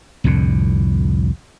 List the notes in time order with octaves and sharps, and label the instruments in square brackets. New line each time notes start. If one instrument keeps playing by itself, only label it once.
[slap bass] C2 F2 A2 D3